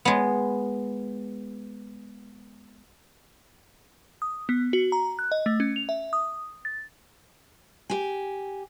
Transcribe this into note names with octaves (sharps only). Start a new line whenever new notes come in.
G#3 B3
D#6
B3
F#4
A#5
F#6
D#5
A3
C#4
F7
E5
D#6
A6
G4 G#5